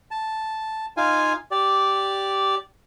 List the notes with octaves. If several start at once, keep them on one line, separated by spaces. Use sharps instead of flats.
A5
D#4 F4 F5 G#5
G4 D5